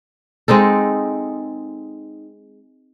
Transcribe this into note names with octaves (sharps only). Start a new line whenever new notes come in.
G#3 C4 D#4 A4